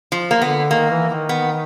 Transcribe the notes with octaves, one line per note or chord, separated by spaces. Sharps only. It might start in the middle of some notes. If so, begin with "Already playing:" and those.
F3
A#3
D3 B3
D#3 A#3
E3
D#3
B3